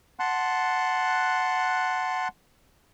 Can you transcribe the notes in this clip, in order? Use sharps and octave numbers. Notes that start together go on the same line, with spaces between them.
F#5 A5 C6 F#6